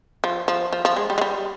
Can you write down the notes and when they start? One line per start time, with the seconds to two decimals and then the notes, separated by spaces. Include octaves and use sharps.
0.24 F3
0.48 F3
0.73 F3
0.85 F3
0.96 G#3
1.10 G3
1.18 G#3
1.21 G3